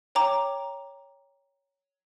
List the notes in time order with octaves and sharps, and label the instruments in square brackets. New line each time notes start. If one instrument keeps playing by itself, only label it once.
[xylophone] C#5 G5 A#5 D6